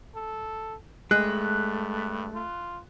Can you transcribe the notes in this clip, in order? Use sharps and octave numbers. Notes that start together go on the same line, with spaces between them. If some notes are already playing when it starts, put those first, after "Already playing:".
A4
G2 G#3 A3 F#6
F4